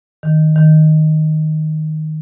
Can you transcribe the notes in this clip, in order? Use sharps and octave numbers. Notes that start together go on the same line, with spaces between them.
D#3
D#3